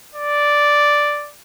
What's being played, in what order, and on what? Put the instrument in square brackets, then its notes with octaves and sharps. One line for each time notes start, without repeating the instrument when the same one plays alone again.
[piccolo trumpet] D5